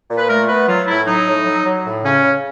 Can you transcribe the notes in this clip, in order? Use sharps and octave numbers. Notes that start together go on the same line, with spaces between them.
A#2
B4
A3 A#4
B3 B4
F#3 F4
A2 E4
F#3 D#4
A2
F#3
F#3
A2
C#3 C#4
C#3